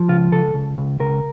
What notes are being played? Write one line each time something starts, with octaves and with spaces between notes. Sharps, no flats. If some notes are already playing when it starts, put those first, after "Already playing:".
Already playing: F3
C#2 F4
C#2 A4
C#2
C#2
C#2 A#4